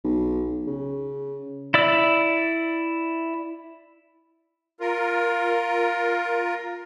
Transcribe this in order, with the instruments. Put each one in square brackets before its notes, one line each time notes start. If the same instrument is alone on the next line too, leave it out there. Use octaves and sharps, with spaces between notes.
[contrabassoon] B1
C#3
[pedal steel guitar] E4 D5 E6
[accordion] F4 A#4